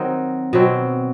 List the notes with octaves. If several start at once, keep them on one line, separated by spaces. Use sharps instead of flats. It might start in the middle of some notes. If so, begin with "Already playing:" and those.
Already playing: D#3 F#3 C4 D#4
B2 F#3 C4